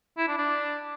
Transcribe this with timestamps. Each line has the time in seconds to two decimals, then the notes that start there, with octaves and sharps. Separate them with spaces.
0.18 E4
0.28 D4
0.38 D4